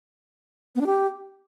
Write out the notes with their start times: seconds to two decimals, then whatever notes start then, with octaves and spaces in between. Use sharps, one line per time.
0.75 B3
0.81 D4
0.86 G4